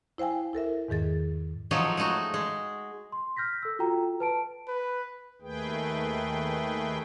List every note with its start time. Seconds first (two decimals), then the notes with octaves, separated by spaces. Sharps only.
0.18 E4 C5 F5 G5 G#5
0.53 E4 A4 A#4 E5
0.88 E2 G#2 D#3 G#4 A6
1.71 F3 F#3 G#3 D#4 A4 C#5
1.97 G#3 A3 D#4 F#4
2.34 G#3
3.12 C6
3.37 F6 G6 A#6 B6
3.62 A4 E6
3.79 F4 F#4 A4 G5 A#5
4.20 B4 A5 D7
4.68 B4
5.42 D#2 D#3 A3 G#4 B4 G5